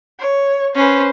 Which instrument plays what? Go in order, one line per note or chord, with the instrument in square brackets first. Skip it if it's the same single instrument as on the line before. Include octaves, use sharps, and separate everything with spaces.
[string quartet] C#5
[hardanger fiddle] C#4 [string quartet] B4 C5